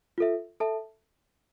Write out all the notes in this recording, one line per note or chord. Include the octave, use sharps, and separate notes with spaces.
F4 A4 E5
A4 E5 A5